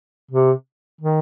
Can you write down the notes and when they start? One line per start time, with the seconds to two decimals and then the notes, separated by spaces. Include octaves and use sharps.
0.31 C3
1.01 D#3